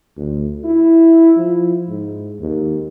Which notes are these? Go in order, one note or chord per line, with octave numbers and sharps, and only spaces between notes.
D2
E4
F3
G#2
D#2